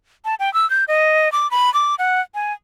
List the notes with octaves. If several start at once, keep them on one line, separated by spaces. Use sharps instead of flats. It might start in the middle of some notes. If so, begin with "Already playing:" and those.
A5
G5
E6
G6
D#5
D6
B5
D6
F#5
G#5